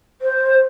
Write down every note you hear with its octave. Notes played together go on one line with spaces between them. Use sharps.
C5